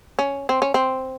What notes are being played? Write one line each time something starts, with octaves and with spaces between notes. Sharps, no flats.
C#4
C4
C#4
C4